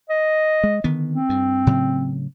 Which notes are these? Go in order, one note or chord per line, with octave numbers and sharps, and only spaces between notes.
D#5
G#3
D3 D#3 B3
C4
G2
A2 C#3 F#3